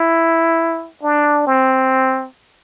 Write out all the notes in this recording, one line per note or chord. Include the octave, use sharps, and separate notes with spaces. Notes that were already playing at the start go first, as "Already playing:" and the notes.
Already playing: E4
D4
C4